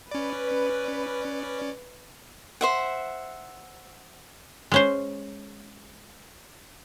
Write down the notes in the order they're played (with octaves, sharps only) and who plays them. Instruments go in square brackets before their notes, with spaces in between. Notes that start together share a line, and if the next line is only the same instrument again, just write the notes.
[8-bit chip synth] C#4 D5 [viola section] B4
[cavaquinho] C5 E5 F#5
[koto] G#3 C#4 C5